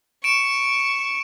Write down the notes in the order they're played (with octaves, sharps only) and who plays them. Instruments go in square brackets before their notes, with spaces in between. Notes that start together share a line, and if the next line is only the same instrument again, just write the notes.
[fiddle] C#6 [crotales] D7 E7